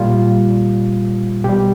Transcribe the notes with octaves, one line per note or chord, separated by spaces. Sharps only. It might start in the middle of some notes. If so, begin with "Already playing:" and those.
Already playing: A#2 G3 F4
B2 G3 G4